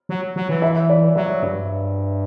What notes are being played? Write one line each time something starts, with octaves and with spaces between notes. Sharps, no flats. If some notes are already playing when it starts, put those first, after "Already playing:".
F#3
F#3
E3
E5
D5
F#3 E5
G2